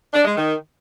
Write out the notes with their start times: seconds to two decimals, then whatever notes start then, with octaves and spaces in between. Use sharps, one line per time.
0.13 D4
0.25 G#3
0.36 D#3